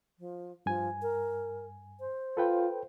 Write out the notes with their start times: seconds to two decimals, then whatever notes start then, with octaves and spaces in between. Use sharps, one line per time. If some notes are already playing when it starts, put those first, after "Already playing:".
0.19 F3
0.66 G2 F3 G#5
1.02 A#4
2.00 C5
2.37 F4 A4 B4 G5